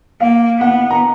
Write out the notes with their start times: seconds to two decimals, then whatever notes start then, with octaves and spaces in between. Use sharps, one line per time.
0.21 A#3 F5
0.60 B3 F#5
0.91 A#5